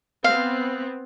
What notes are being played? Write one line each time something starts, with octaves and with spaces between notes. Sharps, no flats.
B3 C4 F5